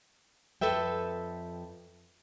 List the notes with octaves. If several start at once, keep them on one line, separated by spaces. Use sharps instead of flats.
F2 A4 B4 E5 G5